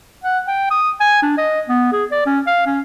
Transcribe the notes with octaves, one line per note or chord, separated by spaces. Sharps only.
F#5
G5
D#6
G#5
D4
D#5
B3
G#4
D5
C#4
F5
C#4